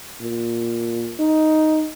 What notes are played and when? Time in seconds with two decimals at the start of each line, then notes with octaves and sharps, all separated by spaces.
0.21 A#2
1.19 D#4